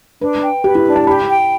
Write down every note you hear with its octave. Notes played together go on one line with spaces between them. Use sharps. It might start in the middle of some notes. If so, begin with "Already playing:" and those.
D4 B4
G5
G4 B4
E4
D4
A5
G4 B5
G5